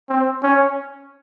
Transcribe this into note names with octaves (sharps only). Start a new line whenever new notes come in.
C4
C#4